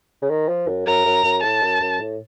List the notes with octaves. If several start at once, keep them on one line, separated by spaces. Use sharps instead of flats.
C#3
D#3
F3
F#2
F#2 A#5
F#2
F#2
A2 A5
F#2
F#2
A2